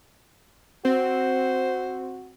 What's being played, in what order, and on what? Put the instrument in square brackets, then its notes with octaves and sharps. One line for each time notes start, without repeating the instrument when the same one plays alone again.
[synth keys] C4 [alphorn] F#4 [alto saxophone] C5